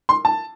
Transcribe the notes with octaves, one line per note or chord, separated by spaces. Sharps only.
C6
A5